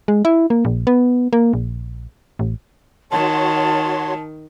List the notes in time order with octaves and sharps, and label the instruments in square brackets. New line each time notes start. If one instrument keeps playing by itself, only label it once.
[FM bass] G#3
E4
A#3
A#1
B3
A#3
A#1
A1
[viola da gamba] D#3 [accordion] F#4 C#5 C6 [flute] A5